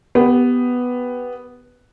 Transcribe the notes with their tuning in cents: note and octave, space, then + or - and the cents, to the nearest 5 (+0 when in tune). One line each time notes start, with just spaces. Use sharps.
B3 +0 G4 +0